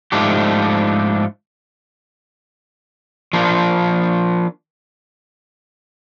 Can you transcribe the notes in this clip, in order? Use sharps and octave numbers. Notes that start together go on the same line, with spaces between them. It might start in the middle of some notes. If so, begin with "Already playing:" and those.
G#2 F3 A3 D4 G4
F3 A#3 D4